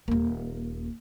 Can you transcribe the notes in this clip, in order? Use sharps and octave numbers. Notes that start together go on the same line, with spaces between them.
D#1 A#3